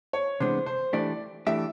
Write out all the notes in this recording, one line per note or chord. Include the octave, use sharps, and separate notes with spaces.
C#5
C3 E3 G#3 B3 D4 C5
C5
E3 A3 D4 G4 D5
E3 A3 D4 G4 E5